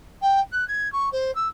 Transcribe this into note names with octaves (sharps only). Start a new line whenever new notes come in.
G5
F#6
G#6
C#6
C5
E6